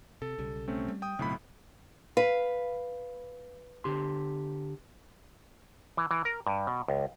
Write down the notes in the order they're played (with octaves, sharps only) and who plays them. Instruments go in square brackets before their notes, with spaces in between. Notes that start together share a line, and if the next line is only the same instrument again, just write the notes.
[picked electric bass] C3 [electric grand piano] A4
[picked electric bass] B1 C#3 G3
[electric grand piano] A3 C4 C#4
[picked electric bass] G3
[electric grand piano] G5 D#6
[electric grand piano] B1 A2 B5 [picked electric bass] C#3 C4
[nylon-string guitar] B4 [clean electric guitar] F5
[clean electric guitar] D3 G4 C6
[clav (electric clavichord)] E3
E3
A#4
G2
B2
C#2